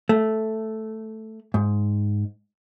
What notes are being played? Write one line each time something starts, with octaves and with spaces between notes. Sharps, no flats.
A3
G#2